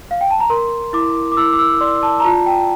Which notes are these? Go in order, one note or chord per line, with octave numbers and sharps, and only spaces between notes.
F5
G5
A5
A#5
A#4 C6
E4 D6
D6
E4 E6
D6
E6
D5 C6
A5
A#5
F4 A5
G5